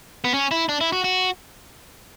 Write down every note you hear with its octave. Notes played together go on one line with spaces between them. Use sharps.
B3
C#4
E4
D4
E4
F#4
F#4